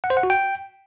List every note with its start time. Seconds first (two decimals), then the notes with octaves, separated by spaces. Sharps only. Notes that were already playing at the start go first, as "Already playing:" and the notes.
0.04 F#5
0.10 C5
0.17 F#5
0.23 F#4
0.30 G5